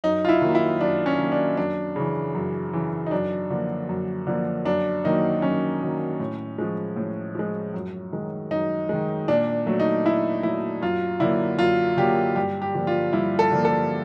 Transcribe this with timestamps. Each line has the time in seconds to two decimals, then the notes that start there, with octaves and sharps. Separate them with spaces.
0.04 F#2 D#4
0.25 F4
0.29 E4
0.42 D#3 F#3 A#3
0.55 E4
0.81 F#2 D4
1.06 C#4
1.19 D#3 F#3 A#3
1.32 D4
1.57 F#2 D4
1.96 C#3 E3
2.35 F#2
2.73 C#3 E3
3.06 D#4
3.11 F#2 D4
3.50 D3 F3 A#3
3.89 F#2
4.27 D3 F3 A#3
4.65 F#2 D4
5.04 D#3 F#3 A#3 D#4
5.42 F#2 C#4
5.81 D#3 F#3 A#3
6.20 A2
6.59 F3 G#3
6.96 A2
7.35 F3 G#3
7.74 F#2
8.12 D#3 G#3
8.51 F#2 D#4
8.89 D#3 G#3
9.28 A#2 D4
9.67 F#3 A3
9.80 D#4
10.05 A#2 E4
10.43 F#3 A3 E4
10.82 F#2 F4
11.20 D3 F#3 A#3 E4
11.59 F#2 F4
11.97 D3 F#3 A#3 G4
12.36 G2 G4
12.62 G4
12.75 D3 F3 A#3
12.87 F4
13.13 G2 E4
13.39 A4
13.51 D3 F3 A#3
13.65 A4